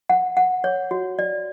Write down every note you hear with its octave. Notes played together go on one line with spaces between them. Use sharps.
F#5
F#5
C#5
F#4
D5